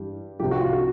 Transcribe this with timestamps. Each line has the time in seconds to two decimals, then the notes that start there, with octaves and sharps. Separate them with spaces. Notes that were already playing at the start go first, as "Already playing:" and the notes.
Already playing: G2 E3 G4
0.40 C2 C3 F3 G4
0.51 F#4
0.61 F4
0.73 F#4